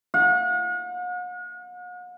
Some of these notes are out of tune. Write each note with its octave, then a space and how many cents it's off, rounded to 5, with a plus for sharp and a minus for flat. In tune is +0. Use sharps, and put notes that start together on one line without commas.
F#5 -45